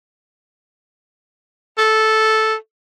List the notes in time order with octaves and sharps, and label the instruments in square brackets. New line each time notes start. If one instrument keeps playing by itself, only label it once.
[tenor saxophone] A4